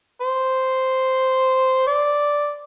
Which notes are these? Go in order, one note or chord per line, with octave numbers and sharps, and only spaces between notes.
C5
D5